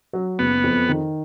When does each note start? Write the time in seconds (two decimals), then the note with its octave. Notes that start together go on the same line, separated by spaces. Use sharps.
0.13 F#3
0.39 F#1 B3
0.64 F2
0.89 D#3